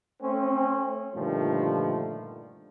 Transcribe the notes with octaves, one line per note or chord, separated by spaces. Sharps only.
A3 C4 C#4
G2 A#2 D3 D#3 F3 A3